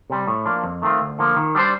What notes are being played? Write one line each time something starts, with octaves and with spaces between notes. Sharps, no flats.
C3 G3
A2
F3 A#3 D4
F2
D#3 A3 C4 F4
D2
D3 F3 A#3
D#3
G3 D4 G4 C5